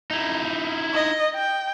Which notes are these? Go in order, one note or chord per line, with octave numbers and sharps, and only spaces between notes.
D#4 E4
D#5
G5